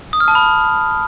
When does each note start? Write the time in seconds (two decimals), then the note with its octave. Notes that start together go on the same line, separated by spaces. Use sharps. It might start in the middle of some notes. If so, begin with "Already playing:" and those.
0.13 D#6
0.20 F6
0.28 A5
0.35 B5